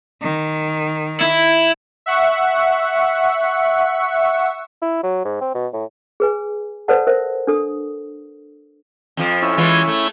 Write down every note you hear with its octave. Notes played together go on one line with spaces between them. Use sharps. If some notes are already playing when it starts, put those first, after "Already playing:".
D#3
E4
E5 F#5 C#6
E4
F#3
G#2
C4
B2
A2
G#4 B4 G#5
A4 B4 C5 D5 F#5 A5
A#4 C5 E5
D4 A4 D#6
F2 F3
C#4 E4
E3 G#3 F4
A3